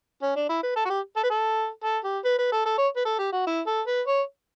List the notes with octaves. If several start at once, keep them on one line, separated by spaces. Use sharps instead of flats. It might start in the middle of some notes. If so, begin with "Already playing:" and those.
C#4
D4
E4
B4
A4
F#4
G4
A4
B4
A4
A4
G4
B4
B4
A4
A4
C#5
B4
A4
G4
F#4
E4
A4
B4
C#5